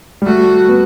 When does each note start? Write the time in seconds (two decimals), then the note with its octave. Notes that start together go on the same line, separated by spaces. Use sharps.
0.22 G3
0.26 A3 F#4
0.69 B3